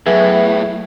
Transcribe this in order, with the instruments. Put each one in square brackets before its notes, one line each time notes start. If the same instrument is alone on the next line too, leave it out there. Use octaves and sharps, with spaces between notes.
[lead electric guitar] A2 [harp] F#3 A4 E6 [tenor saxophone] B3 [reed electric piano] G#4 E5 G#6